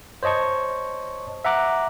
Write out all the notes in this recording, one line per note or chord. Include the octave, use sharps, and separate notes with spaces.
C5 C#5 D#5 A5 C#6
E5 F#5 A#5 D6 F#6